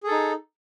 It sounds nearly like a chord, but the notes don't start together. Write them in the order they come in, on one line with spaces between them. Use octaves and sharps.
G#4 A4 D#4